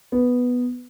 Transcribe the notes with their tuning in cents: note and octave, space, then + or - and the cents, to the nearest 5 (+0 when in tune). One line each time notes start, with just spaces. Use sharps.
B3 +0